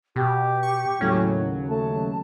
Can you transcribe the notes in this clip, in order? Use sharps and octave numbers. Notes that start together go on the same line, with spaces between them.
B2 G4
C#6
D#2 A2 C#3 F#3 C#4
A3 A5